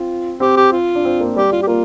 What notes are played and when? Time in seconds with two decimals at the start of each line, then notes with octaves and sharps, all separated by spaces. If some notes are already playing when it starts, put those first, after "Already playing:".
Already playing: C4 F4
0.40 C4 G4
0.57 G4
0.72 F4
0.95 D4
1.05 C4
1.20 A#3
1.36 G3 G4
1.51 G3 F4
1.63 G4
1.67 A#3 F4